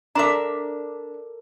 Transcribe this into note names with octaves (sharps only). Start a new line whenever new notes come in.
D4 A4 A#4 D5 E5 A#5 C6 D6